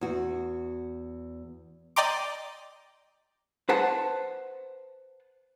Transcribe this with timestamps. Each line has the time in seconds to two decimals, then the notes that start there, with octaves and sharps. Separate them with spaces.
0.01 E2 F#4
1.96 D5 D#5 G5 A#5 C6 D6
3.69 B4 C5 F#5 A5